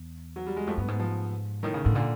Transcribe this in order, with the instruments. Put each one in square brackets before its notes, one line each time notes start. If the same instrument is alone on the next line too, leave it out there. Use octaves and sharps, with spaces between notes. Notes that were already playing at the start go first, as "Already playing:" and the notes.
Already playing: [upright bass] E2
[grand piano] F#3
G3
G#3
[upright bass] F2 [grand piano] A3
[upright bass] G2 [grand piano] B3
[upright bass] G#2 [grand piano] B3
[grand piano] F3
[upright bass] A2 [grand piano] D#3
[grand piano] C#3
[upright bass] A2 [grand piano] D3
[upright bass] A#2 [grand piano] D3